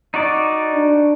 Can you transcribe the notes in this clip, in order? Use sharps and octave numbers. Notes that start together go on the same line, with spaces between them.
D#4 F#4 D5
D4